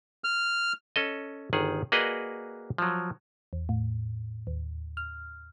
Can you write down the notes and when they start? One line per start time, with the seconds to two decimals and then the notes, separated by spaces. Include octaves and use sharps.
0.24 F6
0.96 C#4 A4 D#5
1.53 G1 D#3 G#4 F#5
1.92 A#3 F#4 G#4 B4 D5 D#5
2.78 F3 F#3
3.53 E2
3.69 A2
4.47 D#2
4.97 F6